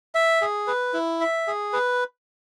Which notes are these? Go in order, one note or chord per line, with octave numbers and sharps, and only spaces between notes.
E5
G#4
B4
E4
E5
G#4
B4